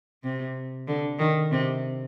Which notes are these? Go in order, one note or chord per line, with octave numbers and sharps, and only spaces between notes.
C3
D3
D#3
C3